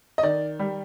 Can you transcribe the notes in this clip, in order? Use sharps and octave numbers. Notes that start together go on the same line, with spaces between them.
D#5
D#3 D5
G3